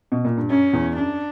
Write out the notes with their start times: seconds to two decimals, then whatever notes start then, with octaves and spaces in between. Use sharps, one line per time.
0.12 B2
0.25 A#2
0.37 G2
0.50 F#2 C#4
0.73 E2
0.96 F#2 D4